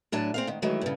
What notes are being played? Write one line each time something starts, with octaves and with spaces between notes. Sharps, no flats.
A2 F#3 D4 G#5 A5
C4 G#4 F5
G#2 D#3
D#3 E3 F#3 G#3 A3
G2 C#3